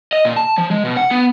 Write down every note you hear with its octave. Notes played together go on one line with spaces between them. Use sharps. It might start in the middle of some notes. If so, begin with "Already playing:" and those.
D#5
A#2
A5
F3
G#3
B2
F#5
B3